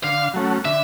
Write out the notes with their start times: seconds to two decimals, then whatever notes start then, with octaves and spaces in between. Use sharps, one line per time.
0.04 D3 F5
0.34 F#3 A3 C#4
0.65 D3 E5